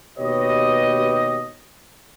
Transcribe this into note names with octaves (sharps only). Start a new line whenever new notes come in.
D#2 B2 G4 B4 C#5 D#5